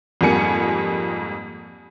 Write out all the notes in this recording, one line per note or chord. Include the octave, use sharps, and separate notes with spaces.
F2 G#2 G3 A#3 G#5 C#7